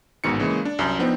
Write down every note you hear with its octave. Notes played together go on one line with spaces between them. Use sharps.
A1 G#2 B2 D#3 C#7
C#3 E3 G#3 A#3
D4
C2 F#2
F3 B3 C4 D4 D#4